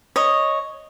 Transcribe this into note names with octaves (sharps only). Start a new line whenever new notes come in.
C#5 D#5